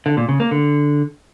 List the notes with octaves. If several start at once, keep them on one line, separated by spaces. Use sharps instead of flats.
D3
A#2
C#3
A#3
D3